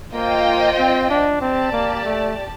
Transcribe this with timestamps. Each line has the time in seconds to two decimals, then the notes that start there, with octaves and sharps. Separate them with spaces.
0.14 A#3 F4 C5 D#5 G5
0.78 C4
1.09 D4
1.41 C4 G4 D5 A5
1.72 A#3
2.05 A3